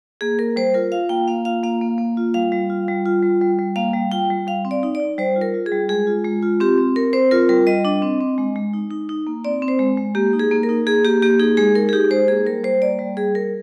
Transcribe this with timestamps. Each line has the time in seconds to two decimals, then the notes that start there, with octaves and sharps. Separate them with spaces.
0.21 A#3 G#4
0.39 A#3 A#4
0.56 G3 C5
0.74 F4 A#4
0.92 F4 F5
1.09 A#3 G5
1.28 A#3 F5
1.45 F4 F5
1.63 A#3 F5
1.81 A#3
1.98 A#3
2.17 F4
2.34 G3 F5
2.52 G3
2.70 F4
2.88 G3
3.06 F4
3.23 G3
3.41 G3
3.59 G3
3.76 A#3 F5
3.94 G3
4.12 F4 G5
4.30 G3
4.47 G3 F5
4.65 C4
4.71 D5
4.83 D#4
4.95 D5
5.00 D#4
5.18 G3 C5
5.36 F4
5.41 A#4
5.54 F4
5.66 G#4
5.72 G3
5.89 G#3 G#4
6.07 F4
6.25 G#3
6.42 F4
6.60 C4 G4
6.78 C4
6.96 C4 A#4
7.13 C4 C5
7.31 F4 A#4
7.49 G3 A#4
7.67 G3 D#5
7.85 D4 D#5
8.02 C4
8.21 C4
8.38 G#3
8.56 G#3
8.73 D#4
8.91 D#4
9.09 D#4
9.27 A#3
9.45 C4 D5
9.62 C4
9.68 C5
9.79 G#3
9.97 G#3
10.15 A#3 G4
10.33 D#4
10.39 G#4
10.51 A#3
10.63 A#4
10.69 D#4
10.87 A#3 G#4
11.04 A#3 G4
11.22 A#3 G4
11.39 D#4 G#4
11.57 G#3 G#4
11.75 D#4 A#4
11.89 G#4
11.93 D#4 G4
12.10 G#3 C5
12.28 A#3 G#4
12.46 G3 A#4
12.63 G3 C5
12.82 A#3 D5
12.99 G3
13.17 G3 G#4
13.35 G3 A#4